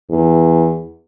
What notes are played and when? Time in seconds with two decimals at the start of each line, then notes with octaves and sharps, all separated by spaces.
0.10 E2